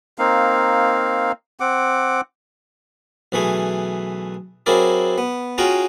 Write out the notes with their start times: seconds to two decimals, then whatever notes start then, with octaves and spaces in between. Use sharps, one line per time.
0.18 A#3 C4 D#4 F5
1.60 C4 F#5 D6
3.32 B1 E3 A3 G#4
4.66 F#3 C4 E4 G#4 A#4 D5
5.18 B3
5.58 C#4 F4 F#4 G#4 G5 A#5